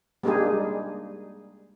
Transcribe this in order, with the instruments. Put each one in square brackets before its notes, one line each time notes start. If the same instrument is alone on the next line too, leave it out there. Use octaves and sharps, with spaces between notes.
[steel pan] G3 G#3 A#3 D4 D#4 G#4